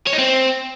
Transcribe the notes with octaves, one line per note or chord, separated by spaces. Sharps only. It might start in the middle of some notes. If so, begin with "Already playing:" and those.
C#5
D#4
C4